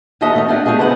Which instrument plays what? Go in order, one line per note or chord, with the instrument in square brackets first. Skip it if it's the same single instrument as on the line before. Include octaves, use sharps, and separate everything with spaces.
[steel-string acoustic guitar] D#2 F#4 A4 C#5 D#5 E5
F2 D#3 A3 A#3 D#5
D4 F4 G4 F5 F#5 G#5
A3 D4 F#4 G#4 D#5
C#3 B3 C5 E5 F#5 A#5